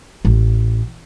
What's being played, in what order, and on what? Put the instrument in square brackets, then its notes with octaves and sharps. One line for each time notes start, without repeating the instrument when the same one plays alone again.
[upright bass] A1